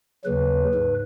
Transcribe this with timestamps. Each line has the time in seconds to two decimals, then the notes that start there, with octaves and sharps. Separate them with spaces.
0.24 D#2 C#3 F#3 B4
0.74 G#2